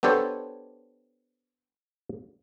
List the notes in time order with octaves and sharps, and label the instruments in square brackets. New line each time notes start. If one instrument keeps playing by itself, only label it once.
[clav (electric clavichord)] B3 D4 G4 A4 C5 C#5